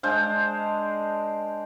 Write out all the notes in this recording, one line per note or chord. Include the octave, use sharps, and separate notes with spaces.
G#3 D4 C5 F5